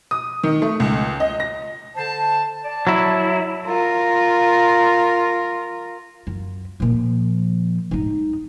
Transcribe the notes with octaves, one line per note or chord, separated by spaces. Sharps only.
D#6
D#3
A3
C#2
D#5
A#6
D3 C5 A5
D5 A5
F#3 E4
F4 A#4
F#2
A#2 F3
G#2 D#4